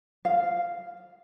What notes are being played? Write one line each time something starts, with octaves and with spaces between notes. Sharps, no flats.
F5